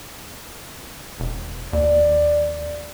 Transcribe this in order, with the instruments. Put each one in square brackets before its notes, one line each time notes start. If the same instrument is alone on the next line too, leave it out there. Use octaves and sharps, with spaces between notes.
[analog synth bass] E1
[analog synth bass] D#2 [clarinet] D5